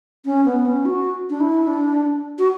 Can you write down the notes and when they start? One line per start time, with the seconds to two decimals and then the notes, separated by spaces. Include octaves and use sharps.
0.25 C#4
0.45 B3
0.66 C#4
0.85 F#4
1.30 D4
1.40 E4
1.67 D4
2.39 F#4